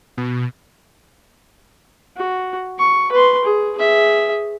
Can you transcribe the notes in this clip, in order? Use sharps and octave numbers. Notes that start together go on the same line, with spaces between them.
B2
F#4
C#6
B4 C6
G#4
G#4 E5